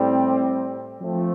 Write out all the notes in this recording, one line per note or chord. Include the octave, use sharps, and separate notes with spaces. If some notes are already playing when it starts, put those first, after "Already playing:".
Already playing: A2 G3 C4
F3 A3 C4